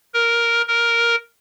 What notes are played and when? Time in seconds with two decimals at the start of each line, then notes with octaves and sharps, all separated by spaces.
0.14 A#4
0.68 A#4